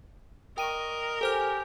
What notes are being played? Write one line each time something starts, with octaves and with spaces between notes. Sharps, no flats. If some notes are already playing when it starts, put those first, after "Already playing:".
A#4 D5 D#5 G5 C#6 D#7
G4 A4 C5 G#5 F6